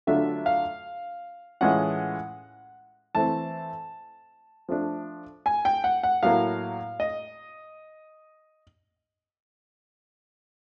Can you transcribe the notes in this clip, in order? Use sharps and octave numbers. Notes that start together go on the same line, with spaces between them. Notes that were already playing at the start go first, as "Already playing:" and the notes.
D3 F#3 A3 D4 F4 E5
F5
A2 E3 G#3 C#4 F4 F#5
E3 A3 C4 A5
F3 A3 D4
G#5
G5
F#5
F#5
A2 F#3 A#3 F5
D#5